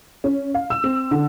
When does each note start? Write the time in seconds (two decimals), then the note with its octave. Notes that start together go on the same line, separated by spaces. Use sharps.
0.24 C#4
0.54 F5
0.70 E6
0.84 C4
1.11 D3